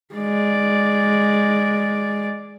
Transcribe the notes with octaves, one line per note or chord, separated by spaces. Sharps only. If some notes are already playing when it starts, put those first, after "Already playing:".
G#3 D5